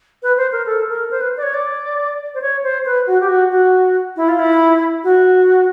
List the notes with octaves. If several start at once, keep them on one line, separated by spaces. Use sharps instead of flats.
B4
C5
A#4
A4
A#4
C5
B4
D5
C#5
D5
C5
C#5
C5
B4
F#4
G4
F#4
F#4
E4
F4
E4
F#4